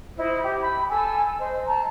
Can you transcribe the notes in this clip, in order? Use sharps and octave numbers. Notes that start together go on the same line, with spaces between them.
E4 C5 D#5
G4
B5
A4 G#5 E6
C5 D#5
A5 A#5